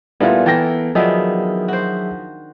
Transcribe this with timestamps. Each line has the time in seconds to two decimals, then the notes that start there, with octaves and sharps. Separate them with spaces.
0.20 A#2 E3 G3 A3 B3 E4 F4
0.46 E3 A4 A#4 G5 A#6
0.95 D#3 F3 F#3 B3 D4 G#4 E5
1.68 F#4 C5